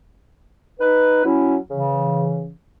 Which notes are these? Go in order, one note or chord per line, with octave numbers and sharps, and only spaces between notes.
D#4 B4
F#3 C#4 E4
C#3 E3